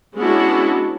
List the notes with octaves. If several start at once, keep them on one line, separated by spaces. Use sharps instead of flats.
G#3 B3 C#4 D4 E4 F#4